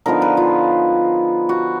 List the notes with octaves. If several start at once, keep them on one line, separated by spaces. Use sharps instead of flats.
D3 F3 B3 D#4 A#4
B4
F4
F#4